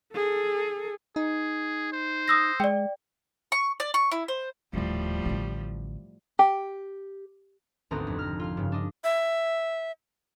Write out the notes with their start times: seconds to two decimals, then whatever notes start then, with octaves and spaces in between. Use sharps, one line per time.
0.15 G#4 A4
1.16 D#4 G#4
1.92 C5
2.28 D#6 E6 A#6
2.60 G#3 D5 G5
3.52 C#6
3.80 D5
3.94 C#6
4.12 E4
4.28 C5
4.73 D#1 D#2 A2 F3 G3
5.26 A1 D3
6.39 G4
7.91 G#1 D2 B3 C4 A#5 D#6
8.07 F2 C3
8.19 F6 A#6
8.40 F4 F6
8.57 G2 C#3
8.72 D4 F4 D#5
9.04 E5